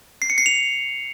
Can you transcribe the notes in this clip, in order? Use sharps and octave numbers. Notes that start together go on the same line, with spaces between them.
C7
C#7
C7
F7